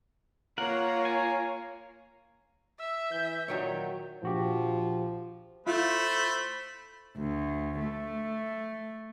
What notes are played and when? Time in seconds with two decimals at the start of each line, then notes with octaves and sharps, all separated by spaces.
0.58 A#3 F4 A#4 C#5 F#5
1.05 G#5
2.80 E5 E6
3.11 E3 G6
3.48 A#2 D#3 F#3 C#5
4.23 A#1 F3 F#4 G4
5.66 A3 E4 F4 C5 B5
7.18 D2
7.79 A3